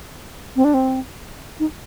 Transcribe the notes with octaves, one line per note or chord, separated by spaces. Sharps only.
C4
D4
C4
D#4